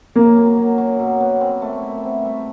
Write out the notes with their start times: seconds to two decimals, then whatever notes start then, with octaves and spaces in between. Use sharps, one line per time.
0.15 C#3 A#3
0.36 F#2
0.57 F#3
0.78 F#3
0.99 B2
1.20 B3
1.41 C4
1.62 A3
1.82 E4
2.04 C4
2.25 G3